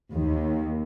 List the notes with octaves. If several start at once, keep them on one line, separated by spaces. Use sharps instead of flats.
D#2